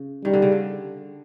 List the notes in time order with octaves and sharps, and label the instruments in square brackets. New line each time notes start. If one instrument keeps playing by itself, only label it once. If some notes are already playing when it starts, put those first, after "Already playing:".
Already playing: [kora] C#3
[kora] D#3 [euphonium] G3
[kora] D3
C#3
D3